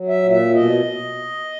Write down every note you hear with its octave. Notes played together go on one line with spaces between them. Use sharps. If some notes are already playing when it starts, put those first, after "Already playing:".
Already playing: F#3
E5
A#2
E5
B2 D#5